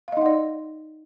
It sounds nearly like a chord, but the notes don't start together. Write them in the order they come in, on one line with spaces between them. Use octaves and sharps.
F5 D#5 D#4 F#5 D5